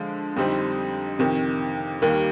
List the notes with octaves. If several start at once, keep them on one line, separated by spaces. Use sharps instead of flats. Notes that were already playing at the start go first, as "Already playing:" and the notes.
Already playing: D3 F3 G#3
F2 D3 G3 C4 D#4
F2 C3 D#3
D#2 D#3 G3 A#3